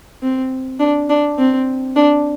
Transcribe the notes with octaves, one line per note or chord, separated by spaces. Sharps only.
C4
D4
D4
C4
D4